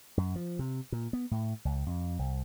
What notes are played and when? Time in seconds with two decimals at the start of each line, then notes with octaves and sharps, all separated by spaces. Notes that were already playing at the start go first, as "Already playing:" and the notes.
0.17 F#2
0.36 F3
0.59 C3
0.92 A#2
1.13 B3
1.31 A2
1.65 C#2
1.86 F2
2.19 C2